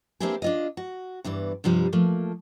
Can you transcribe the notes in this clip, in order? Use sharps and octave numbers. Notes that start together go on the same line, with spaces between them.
A#3 C4 D4 E4 G4 G#4
D4 F4 D#5
F#4
E2 G2 E3 D5
G2 C3 F3 G3
F3 A3 A#3